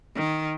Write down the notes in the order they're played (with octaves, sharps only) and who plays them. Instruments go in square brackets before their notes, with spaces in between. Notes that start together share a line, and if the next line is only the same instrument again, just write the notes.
[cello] D#3